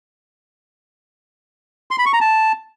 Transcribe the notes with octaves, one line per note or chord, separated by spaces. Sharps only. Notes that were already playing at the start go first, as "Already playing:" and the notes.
C6
B5
C#6
A#5
A5